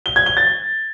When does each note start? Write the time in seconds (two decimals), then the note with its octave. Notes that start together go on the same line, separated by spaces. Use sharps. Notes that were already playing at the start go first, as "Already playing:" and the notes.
0.06 G7
0.16 G#6
0.26 G7
0.37 A6